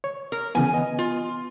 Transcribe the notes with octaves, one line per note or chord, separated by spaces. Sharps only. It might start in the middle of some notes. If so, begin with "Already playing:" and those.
C#5
A#4
C#3 E3 B3 G#5
B3 D#5
F4